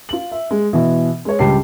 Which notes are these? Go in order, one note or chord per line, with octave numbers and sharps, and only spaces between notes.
F4 F#7
E5
G#3
B2 E3
G#3 C#5
C#2 G2 G4 A5 C7